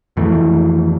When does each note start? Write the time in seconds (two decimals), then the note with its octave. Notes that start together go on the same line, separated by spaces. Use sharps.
0.17 F2 D#3 E3 A3